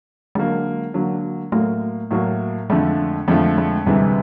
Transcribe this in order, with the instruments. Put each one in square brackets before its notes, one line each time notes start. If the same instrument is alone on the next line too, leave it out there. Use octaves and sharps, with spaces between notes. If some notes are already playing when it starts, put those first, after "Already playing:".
[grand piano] D3 F#3 A#3 [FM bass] G#3
[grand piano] D3 F#3 A#3
[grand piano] A2 F#3 A#3 [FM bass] A3
[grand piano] A2 F#3 A#3
[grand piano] F2 D3 F3 A3 [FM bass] G#3
[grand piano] F2 D3 F3 A3 [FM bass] G#3
[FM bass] G#3
[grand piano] D2 C3 E3 G#3 [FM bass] G3